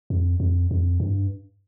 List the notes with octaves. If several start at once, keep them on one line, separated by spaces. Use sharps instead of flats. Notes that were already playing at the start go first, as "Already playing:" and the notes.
F2
F2
F2
G2